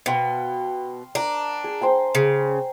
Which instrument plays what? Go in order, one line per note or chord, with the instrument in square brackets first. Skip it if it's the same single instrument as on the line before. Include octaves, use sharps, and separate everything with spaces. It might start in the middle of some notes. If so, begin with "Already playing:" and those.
[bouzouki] B2 [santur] F5 G5 C6
[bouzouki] D4 [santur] A#4 A#5
[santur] G#4
C5 G5 G#5
[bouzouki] C#3